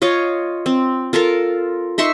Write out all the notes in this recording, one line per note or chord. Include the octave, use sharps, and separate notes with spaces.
F4 C#5 D#5 F5
C4
F4 A4 A#4 F5
D#4 E5 C6 C#6